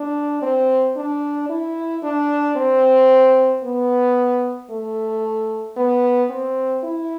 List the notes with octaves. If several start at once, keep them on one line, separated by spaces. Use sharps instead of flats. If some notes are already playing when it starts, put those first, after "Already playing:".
Already playing: D4
C4
D4
E4
D4
C4
B3
A3
B3
C4
E4